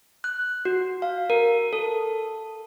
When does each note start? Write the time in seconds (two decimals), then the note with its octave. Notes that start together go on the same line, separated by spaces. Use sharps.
0.24 F#6
0.65 F#4
1.02 F5
1.30 A#4
1.73 A4